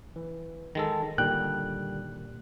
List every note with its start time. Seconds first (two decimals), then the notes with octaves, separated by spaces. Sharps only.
0.16 E3
0.75 D#3 G#3 A4 A#6
1.18 A#2 D3 D#3 G3 G5 F#6